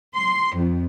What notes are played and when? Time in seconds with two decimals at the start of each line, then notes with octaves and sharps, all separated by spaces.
0.16 C6
0.55 F2